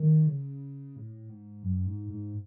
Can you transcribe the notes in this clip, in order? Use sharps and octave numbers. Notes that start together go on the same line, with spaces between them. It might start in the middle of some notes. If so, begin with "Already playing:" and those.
Already playing: D#3
C#3
A2
G#2
F#2
G#2
G#2